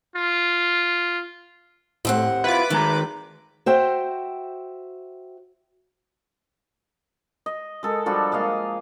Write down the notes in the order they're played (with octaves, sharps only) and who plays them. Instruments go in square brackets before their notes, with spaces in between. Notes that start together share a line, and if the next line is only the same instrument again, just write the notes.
[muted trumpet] F4
[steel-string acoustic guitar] D#2 C4 F#5 [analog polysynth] A2
[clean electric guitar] E4 F4 [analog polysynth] B4 D6
[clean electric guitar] D#3 G#3 A#5 [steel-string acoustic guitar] A3
[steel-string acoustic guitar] F#4 C5 E5 G5
[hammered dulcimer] D#5
G#3 A4 A#4
F3 G3 D4 F#4
G#3 A#3 D#5 F5